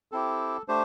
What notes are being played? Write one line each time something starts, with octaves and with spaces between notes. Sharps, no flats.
C4 E4 G4 A4
A3 D4 G4 C5